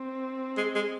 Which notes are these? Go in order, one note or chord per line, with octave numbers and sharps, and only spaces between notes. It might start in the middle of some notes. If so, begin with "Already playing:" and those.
Already playing: C4
G#3
G#3